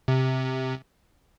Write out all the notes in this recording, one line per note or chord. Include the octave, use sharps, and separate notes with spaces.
C3